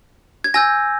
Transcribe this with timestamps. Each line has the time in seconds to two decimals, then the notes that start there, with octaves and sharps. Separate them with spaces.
0.44 G#6
0.54 G#5 E6 G6 A#6